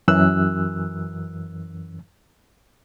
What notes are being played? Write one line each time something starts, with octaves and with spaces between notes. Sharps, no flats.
F#2 E3 E6 F#6